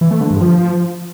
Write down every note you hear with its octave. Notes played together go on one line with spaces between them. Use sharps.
E3
A3
D3
G2
F3